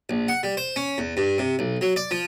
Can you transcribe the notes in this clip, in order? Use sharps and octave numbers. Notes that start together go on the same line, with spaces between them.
A#1
F#5
G3
C5
C#4
E2
G2
C3
B1
F#3
D5
F3